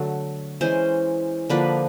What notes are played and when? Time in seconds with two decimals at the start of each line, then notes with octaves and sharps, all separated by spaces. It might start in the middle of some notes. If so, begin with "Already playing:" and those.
Already playing: D3 F#3 A3
0.61 E3 G#3 C#4 C5
1.50 D3 F3 A#3 D4 B4